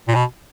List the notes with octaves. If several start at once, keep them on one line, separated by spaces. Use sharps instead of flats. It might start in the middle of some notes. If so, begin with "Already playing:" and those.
A#2
B2